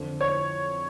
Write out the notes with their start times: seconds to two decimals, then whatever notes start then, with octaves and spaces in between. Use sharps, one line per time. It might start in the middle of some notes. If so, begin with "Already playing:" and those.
Already playing: F2 D3 F3
0.21 C#5